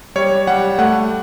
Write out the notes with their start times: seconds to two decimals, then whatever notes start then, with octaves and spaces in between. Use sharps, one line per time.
0.15 G3 C#5
0.47 G3 F#5
0.79 A3 F#5